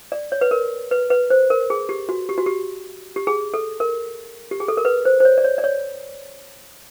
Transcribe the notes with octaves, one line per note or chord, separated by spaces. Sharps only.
D5
C#5
B4
A#4
B4
B4
C5
A#4
G#4
G4
F#4
G4
F#4
G4
G4
G#4
A4
A#4
G4
G#4
A4
A#4
B4
C5
C5
C#5
D5
C#5
D5
C#5